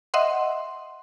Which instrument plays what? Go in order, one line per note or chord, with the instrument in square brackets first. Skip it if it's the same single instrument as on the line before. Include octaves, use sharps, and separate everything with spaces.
[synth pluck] D#5 E5 F#5 C6